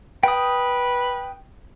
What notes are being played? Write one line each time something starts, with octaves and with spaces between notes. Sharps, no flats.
B4 G5 D#6